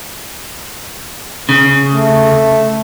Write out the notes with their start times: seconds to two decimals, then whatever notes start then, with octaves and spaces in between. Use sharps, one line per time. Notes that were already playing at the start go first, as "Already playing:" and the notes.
1.49 C#3
1.92 A3